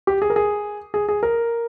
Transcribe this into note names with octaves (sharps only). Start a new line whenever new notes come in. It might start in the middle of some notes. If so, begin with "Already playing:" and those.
G4
G#4
A#4
G#4
G#4
G#4
A#4